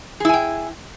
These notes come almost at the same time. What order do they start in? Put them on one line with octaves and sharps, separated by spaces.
G#4 E4 G#5 G5